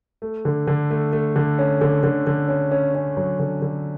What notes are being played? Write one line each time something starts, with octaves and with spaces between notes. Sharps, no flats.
A3
D3
D3
A3
A3
D3
C#4
D3
D3
D3
C#4
C#4
C#4
F#3
D3
D3